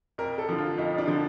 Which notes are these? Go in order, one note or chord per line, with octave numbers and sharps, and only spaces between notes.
F2 A#4
A4
D3 F3
F4
F2 D#4
D4
D3 F3